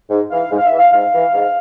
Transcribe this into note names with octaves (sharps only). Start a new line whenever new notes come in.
G#2
E3 F5
G#2
F5
E5
E3
F5
G#2 F5
E3
G#2